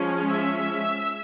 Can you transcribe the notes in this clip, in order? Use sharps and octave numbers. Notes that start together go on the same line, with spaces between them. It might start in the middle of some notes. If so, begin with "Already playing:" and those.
Already playing: F3 G#3 C#4
E5